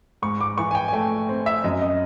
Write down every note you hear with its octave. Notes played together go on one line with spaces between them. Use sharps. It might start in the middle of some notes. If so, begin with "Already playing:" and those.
G#2 C#6
D6
E3 C#6
G#5
G5
G#5
A3 G5
C4
E5
F#2 D#5
D#5